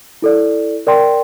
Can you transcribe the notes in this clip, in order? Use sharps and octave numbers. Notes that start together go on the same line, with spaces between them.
E4 A4 D5
A#4 D5 G5 C6